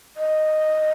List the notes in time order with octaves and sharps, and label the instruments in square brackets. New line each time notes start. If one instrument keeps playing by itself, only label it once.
[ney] D#5